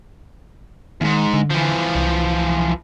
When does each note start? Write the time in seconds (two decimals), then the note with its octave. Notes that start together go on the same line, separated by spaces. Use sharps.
1.01 E2 G#2 D#3
1.34 D3
1.51 E3 F3
1.95 C2